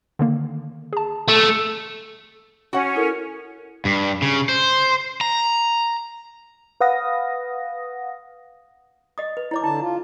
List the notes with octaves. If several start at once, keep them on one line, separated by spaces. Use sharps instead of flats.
D3 D#3 A#3
G#4 A5
A3
C#4 F#4 F#5
E4 A4 A#4
G2
C#3
C5
A#5
B4 F5 F#5 D#6 A#6
D#5 D#6
B4
E4 C#5 D6
D3 E4 A5
F4